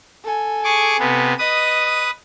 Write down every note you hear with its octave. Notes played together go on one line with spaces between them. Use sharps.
A4 G#5
G#4 C#6 D6
C3 B3
B4 D#5 D#6